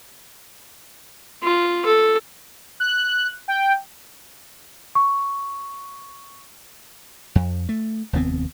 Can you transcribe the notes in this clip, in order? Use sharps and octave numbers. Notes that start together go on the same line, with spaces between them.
F4
A4
F#6
G5
C#6
F2
A3
F1 D#2 B3 C4